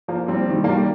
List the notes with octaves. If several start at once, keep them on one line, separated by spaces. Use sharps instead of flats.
F3 A#3
G3 C4
D#3 G3
A#3
D#3 G3